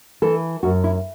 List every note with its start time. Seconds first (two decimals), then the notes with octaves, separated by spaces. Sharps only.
0.22 E3 A4
0.63 F#2 F#4
0.84 E4